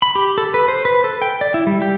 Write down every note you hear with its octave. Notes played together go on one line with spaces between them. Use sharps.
B5
G4
A4
B4
C5
B4
A4
G5
D5
E4
G3
G4